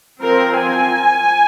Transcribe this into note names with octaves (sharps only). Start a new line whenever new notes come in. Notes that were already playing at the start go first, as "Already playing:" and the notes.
F3 C4 A#4
G#5